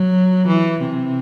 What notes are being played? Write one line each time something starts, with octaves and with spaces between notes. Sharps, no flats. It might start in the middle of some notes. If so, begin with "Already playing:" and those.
Already playing: F#3
E3
C3